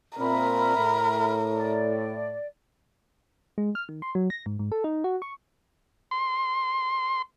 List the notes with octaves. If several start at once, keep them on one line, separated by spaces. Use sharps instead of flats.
A#2 C4 A#4 E5 B5 F6
A2
D5
G#3
F6
D#3
C6
F#3
A#6
G#2
G#2
A4
D#4
F#4
C#6
C6